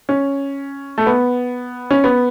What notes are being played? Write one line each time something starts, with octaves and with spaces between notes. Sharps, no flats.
C#4
A3
B3
C#4
B3